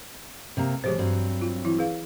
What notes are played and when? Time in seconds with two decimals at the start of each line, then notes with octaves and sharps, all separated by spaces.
0.57 C3 A#3 A#5
0.84 B2 E3 F#3 G#3 G4 C5
0.98 G2 F#3 C4
1.42 F4
1.65 E3 E4
1.79 G#4 B4 F5